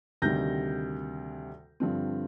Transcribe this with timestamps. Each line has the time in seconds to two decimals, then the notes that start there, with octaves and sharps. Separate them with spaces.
0.22 D2 C3 D#3 G3 G6 A#6
1.80 G2 D3 F3 C4